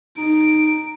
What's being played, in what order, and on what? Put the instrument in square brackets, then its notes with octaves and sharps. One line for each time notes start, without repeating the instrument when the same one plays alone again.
[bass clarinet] D#4 [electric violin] D7